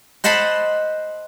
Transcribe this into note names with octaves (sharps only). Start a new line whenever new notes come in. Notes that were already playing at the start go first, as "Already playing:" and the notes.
C5 D#5 F#5 A5 B5 C6